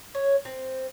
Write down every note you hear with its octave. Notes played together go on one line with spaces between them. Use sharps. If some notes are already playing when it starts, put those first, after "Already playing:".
C#5
C4